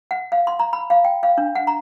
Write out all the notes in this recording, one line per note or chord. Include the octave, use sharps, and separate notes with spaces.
F#5
F5
C6
A#5
B5
F5
G5
F5
D4
F#5
A#5